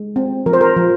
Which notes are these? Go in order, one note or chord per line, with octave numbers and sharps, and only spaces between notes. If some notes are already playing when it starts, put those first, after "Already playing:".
Already playing: G#3
C4
F3 A#4
C5
A#4
F3